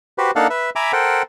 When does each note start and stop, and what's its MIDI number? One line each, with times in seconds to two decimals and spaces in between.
0.18 0.31 66
0.18 0.31 67
0.18 0.31 71
0.18 0.31 72
0.36 0.47 58
0.36 0.47 62
0.36 0.47 63
0.36 0.47 69
0.36 0.47 77
0.36 0.47 78
0.50 0.70 71
0.50 0.70 76
0.76 0.92 76
0.76 0.92 80
0.76 0.92 82
0.76 0.92 83
0.76 0.92 86
0.93 1.22 69
0.93 1.22 70
0.93 1.22 72
0.93 1.22 78
0.93 1.22 79